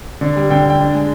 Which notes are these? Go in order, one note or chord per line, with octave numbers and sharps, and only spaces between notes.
D3
G3
D3 G5
D3 G5
D4
G#3